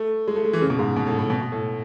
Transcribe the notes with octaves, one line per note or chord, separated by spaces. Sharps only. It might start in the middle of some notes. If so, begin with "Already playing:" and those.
Already playing: A3
G#3
A3
G#3
E3
C#3
B2
G#2
B2
A2
A2
B2
B2
A2